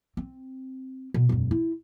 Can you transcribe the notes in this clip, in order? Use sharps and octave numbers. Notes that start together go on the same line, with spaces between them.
C4
B2
E1 F#2
E4